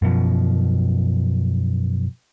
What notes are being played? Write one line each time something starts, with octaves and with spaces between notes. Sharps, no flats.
F#2 B2 F3